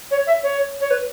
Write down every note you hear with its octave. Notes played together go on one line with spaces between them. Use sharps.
C#5
E5
C#5
C#5
B4